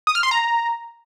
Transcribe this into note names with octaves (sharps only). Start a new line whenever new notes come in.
D#6
F6
C6
A#5